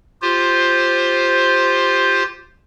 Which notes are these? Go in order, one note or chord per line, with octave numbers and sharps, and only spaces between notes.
F4 G4 C5